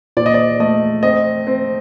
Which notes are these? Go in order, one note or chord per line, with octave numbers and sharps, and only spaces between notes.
A#2 D5
D#5
D5
A3 D#5
C4 D#5
C4